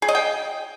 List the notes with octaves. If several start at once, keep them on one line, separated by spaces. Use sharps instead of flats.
G#4
D#5
G5